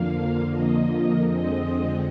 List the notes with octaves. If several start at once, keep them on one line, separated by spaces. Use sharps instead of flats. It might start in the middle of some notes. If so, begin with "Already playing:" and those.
Already playing: F2 D3 F3 A#3 F5
D#5
F2 D3 G#3 C4 D#5